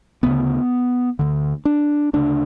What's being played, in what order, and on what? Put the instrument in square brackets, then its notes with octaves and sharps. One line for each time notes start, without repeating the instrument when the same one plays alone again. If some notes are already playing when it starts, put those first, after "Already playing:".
[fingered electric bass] D2 C#3 B3
D2 D3
D4
D2 C#3 D4